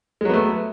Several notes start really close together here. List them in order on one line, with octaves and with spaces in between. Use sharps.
G#3 F#3 B3 A3